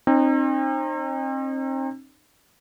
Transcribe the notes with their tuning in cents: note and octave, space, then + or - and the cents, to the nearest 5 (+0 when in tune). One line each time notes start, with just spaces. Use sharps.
C4 +35 D#4 -30